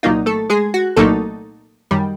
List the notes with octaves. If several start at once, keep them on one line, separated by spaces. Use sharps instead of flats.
C2 A#2 F#3 A#3 D#4 F4
A3 A4
G#3 G#4
F#4
C2 A#2 F#3 A3 A#3 D#4 A4
F#2 D#3 G3